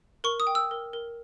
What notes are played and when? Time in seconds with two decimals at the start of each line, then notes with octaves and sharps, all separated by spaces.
0.24 A#4 C#6
0.40 D#6
0.47 G5
0.55 E6
0.71 A#4
0.93 A#4